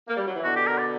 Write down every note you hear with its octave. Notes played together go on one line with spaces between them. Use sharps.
A#3
G3
F#3
E3
B2 D3 F#4
G4
A#4
D5